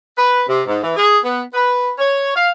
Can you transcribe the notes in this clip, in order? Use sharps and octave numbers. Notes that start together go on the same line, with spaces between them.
B4
C3
G#2
E3
G#4
B3
B4
C#5
F5